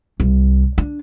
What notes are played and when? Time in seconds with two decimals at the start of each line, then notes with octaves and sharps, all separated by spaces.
0.20 C2
0.78 D4